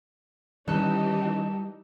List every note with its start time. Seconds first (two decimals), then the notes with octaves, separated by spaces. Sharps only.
0.68 D#3 E3 G3 C#4 D#4 G4 A4 F#6